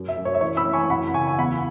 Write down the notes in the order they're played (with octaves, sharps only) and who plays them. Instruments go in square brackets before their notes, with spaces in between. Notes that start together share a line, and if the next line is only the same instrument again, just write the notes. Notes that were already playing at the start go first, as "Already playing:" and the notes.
Already playing: [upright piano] F#2
E5
F#2
C#5
E5
E3 C#5
B5 E6
E3
G#5 C#6
F#2 F#5 B5
B5
C#3 G#5 C#6
G#5
E2 F#5 B5